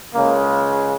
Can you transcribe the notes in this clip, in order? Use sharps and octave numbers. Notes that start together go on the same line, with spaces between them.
C#2 C#3 G#3 A#3